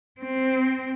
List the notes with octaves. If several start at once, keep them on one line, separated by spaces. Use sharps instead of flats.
C4